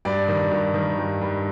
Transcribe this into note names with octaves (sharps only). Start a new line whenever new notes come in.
G2 D5
D#3
G2
D#3
G2
G2